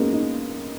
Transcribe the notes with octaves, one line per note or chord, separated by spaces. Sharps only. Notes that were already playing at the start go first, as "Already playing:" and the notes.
Already playing: G#3 A#3 B3 C#4
D#4